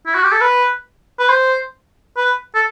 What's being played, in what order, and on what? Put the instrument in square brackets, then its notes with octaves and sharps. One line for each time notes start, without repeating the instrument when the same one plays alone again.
[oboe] E4
F#4
G4
A4
B4
B4
C5
B4
A4